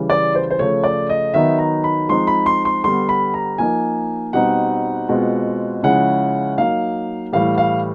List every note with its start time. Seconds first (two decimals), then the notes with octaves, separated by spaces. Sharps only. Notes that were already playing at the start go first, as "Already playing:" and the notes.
Already playing: C#3 E3 G3
0.10 D5
0.35 C5
0.50 C5
0.59 C#3 F3 A3 C#5
0.84 D5
1.09 D#5
1.34 D#3 F#3 B3 D#4 E5
1.58 A#5
1.84 B5
2.08 F3 G#3 C4 D#4 C6
2.27 B5
2.46 C6
2.65 C6
2.84 D3 G3 B3 C6
3.09 B5
3.34 A#5
3.58 F3 A#3 D#4 G#5
4.33 B2 G3 C4 D#4 F#5
5.09 B2 G#3 C4 F4
5.83 C#3 F3 G#3 C#4 E4 F#5
6.58 F#3 A#3 D#4 F5
7.33 A2 E3 G3 F5
7.58 F5